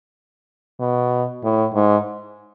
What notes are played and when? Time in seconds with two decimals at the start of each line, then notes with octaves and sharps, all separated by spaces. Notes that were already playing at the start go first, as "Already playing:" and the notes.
0.80 B2
1.43 A2
1.74 G#2